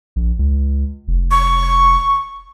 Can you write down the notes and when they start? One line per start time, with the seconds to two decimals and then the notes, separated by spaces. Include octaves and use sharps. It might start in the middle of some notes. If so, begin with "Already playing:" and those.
0.16 A#1
0.39 C#2
1.08 F1
1.31 C#6